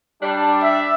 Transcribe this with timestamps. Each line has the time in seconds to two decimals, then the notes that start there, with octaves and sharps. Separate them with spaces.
0.23 G3 D4
0.63 E5